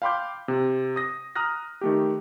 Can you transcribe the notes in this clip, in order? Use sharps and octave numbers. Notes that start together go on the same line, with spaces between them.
F5 G5 B5 C6 D6 G6
C3
D#6 A#6
A#5 D#6 F6 F#6 A#6
D#3 A3 G4